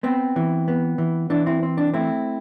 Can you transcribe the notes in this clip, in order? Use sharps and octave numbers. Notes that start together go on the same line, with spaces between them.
B3 C4
E3
B3
E3
E3 D4
C4 E4
C4
D4
A3 C4 E4